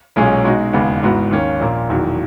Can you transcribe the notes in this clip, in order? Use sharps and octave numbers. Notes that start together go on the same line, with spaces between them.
B1 A#2 G#3 C#4 G#4
B2 G#3 D#4 F#4
E1 D#2 C#3 G#3 B3
G#1 G#2 E3 B3 F#4
D#2 D#3 A#3 C#4
A#1 A#2 A#3
E1 E2 D#3 F#3